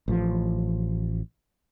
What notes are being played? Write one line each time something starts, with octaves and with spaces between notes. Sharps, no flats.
A1 F3